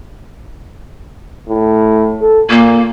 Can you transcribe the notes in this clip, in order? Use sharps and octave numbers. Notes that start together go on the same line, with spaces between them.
A2
A4
A#2 A#3